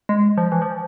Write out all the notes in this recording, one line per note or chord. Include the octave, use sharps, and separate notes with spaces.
G#3
F3
E3
F3